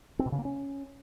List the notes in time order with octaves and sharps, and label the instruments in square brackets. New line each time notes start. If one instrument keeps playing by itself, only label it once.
[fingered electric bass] C4
B2
C#3
A#3
C#4